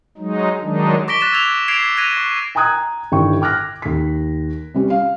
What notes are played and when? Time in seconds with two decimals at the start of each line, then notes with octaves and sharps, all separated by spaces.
0.18 F#3 G#3 D#4
0.62 D#3 F#3 G#3 D4 D#4
1.08 C#6 D6 A#6 B6 D7 G7
1.21 F#6 A6 B6 E7
1.32 E6 G#6 F7 G7
1.68 G#6 C7 D7 F7
1.97 F#6 G#6 A#6 D#7 F7
2.17 C#6
2.55 G5 G#5 A#5 D#6 F#6 G#6
3.12 G1 G2 D#3 E4 G5 C#6
3.41 G5 D6 F6 F#6 A#6
3.82 D#2 B6
4.74 C3 G3 C#4
4.90 F5